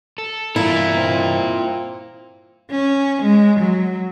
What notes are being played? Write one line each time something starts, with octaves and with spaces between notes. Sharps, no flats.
A4
G2 E3 E4 F4 A#4
C4
C#4
G#3
F#3